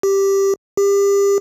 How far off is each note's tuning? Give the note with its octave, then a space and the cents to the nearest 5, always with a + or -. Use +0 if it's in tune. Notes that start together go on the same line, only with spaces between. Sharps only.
G4 +0
G4 +30